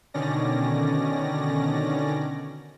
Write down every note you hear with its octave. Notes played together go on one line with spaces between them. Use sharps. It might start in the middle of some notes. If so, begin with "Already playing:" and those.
B2 D3 D#3 C#4 D5 A#6